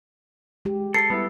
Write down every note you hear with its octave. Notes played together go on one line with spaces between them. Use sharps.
G#3 G4
A4 C7 C#7
G3 B3 E4